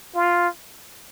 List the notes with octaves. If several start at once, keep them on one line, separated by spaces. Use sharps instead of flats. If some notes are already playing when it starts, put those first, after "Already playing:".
F4